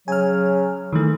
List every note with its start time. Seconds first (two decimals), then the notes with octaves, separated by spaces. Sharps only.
0.08 C#3 F#3 G#5 F6
0.93 D#3 E3 A3